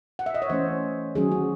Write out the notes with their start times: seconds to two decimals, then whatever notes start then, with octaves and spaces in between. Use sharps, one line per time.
0.19 F#5
0.26 E5
0.34 D#5
0.42 C#5
0.50 E3 A3 C#4 C5
1.15 D#3 F#3 C#4 G#4
1.31 F#4